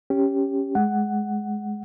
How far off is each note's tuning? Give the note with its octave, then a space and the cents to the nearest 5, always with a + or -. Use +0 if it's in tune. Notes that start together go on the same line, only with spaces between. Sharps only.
C#4 +0 G4 +0
G#3 +10 F#5 +5